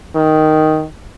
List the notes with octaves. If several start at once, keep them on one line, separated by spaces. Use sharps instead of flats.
D#3